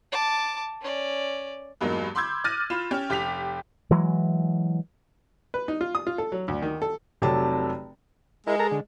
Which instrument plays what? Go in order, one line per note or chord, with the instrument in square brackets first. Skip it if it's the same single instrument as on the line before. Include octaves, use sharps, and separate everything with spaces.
[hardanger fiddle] A5 D6
C#4 D5
[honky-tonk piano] E2 G2 F#3 G#3 A#3 D#4
B5 C6 D6 E6 G6 G#6
D6 F6 F#6 A6 A#6 D#7
F4 B5 E7
C#4 G4
F1 G4 D6 B6 F7
[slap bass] E3 F#3 G#3
[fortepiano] B4
D#4
F4
D#6
F4
A4
F#3
D2
D#3
A4
[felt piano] F1 C3 F#3 G4 A4 A5
[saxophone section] G#3 [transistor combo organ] E4 A#4
[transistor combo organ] A4 A#4 A#5
D3